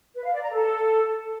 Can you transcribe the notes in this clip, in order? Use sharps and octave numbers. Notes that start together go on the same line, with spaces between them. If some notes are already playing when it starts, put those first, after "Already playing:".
B4
F5
D5
A#5
A4